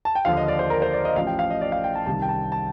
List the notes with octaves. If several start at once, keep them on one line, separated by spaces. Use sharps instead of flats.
A5
G5
D#2 D3 F3 F5
D#5
D5
C5
A#4
C5
D5
D#5
A1 A2 F3 F5
G5
F5
D#5
D5
F5
G5
A5
C2 C3 D#3 A5
G5
A5
A5